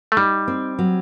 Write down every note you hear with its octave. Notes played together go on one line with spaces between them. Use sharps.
A3
G3 D#4
C4
F#3